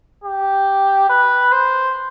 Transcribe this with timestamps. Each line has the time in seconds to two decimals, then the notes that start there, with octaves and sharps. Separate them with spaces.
0.24 G4
1.09 B4
1.52 C5